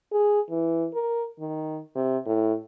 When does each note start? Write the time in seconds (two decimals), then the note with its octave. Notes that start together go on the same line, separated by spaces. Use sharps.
0.12 G#4
0.50 E3
0.94 A#4
1.40 D#3
1.95 C3
2.26 A2